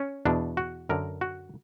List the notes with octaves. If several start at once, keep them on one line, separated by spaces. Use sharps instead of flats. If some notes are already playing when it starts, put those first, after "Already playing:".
Already playing: C#4
E2 B2 D4
F#4
F#2 D3 A#4
F#4